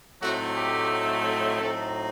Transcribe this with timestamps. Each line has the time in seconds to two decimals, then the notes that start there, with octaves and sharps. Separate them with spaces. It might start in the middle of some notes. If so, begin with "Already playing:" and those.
0.20 A2 F#3 A3 C4 D#4 F#4
0.55 G4
1.59 A2 F#3 C4 D#4 A4